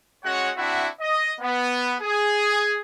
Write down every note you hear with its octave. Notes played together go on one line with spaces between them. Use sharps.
G#3 C#4 F#4 C#5 F#5
C4 D4 E4 F#4 E5 F#5
D#5
B3
G#4